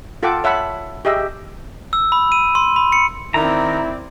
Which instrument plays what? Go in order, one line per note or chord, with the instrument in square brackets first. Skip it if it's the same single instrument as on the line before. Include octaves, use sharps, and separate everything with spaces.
[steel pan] F4 A4 F#5 G5 A5 D6
C#5 E5 F#5 A5 B5
G4 G#4 D#5 E5
[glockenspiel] E6
B5
D#7
C6
B5
C#7
[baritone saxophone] D#3 [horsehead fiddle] C4 D5 [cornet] E4 [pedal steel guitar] A#5